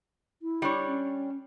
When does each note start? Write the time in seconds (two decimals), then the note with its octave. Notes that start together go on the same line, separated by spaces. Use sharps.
0.42 E4
0.62 G3 D4 C#5
0.87 C#4